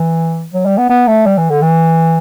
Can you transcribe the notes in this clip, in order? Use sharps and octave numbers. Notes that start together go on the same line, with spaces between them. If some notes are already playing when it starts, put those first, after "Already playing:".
Already playing: E3
F#3
G3
B3
B3
A3
G3
E3
D3
E3